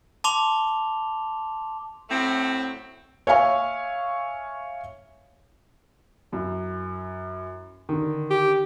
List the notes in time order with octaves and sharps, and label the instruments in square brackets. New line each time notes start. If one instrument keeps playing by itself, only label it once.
[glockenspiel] A5 C6 D6 F7 G7
[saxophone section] A2 F#3 A3 C4
[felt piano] C#5 E5 F5 G#5 C#6
[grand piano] F#2 E4
D3 D#3
[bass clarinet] G4